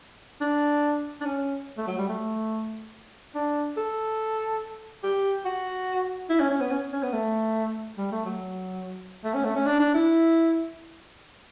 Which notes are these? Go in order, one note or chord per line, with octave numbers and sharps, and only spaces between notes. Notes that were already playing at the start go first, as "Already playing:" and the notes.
D4
D4
C#4
A3
F#3
G3
A3
D4
A4
G4
F#4
E4
C#4
C#4
B3
C#4
C#4
B3
A3
G3
A3
F#3
A3
C#4
A3
C#4
D4
D4
E4